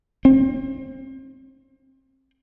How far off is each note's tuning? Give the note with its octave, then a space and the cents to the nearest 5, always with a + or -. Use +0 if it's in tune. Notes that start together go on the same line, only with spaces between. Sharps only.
C4 +30